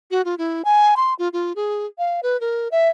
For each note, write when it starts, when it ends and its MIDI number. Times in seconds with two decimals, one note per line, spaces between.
0.11 0.22 66
0.25 0.35 65
0.38 0.62 64
0.65 0.95 80
0.97 1.14 84
1.19 1.29 65
1.33 1.53 65
1.56 1.86 68
1.98 2.20 77
2.23 2.39 71
2.41 2.68 70
2.72 2.89 76